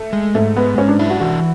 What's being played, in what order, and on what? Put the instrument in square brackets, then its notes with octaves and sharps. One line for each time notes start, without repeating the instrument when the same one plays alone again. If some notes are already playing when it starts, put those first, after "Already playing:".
Already playing: [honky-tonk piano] A3
[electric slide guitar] G#3
[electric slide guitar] G#2 [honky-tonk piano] A3
[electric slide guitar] G#3 [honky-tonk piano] B3
[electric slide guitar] G#2 [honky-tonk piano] C#4
[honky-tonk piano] D4
[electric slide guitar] D4 [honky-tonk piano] E4
[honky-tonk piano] F#4
[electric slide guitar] E3 [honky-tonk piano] F#4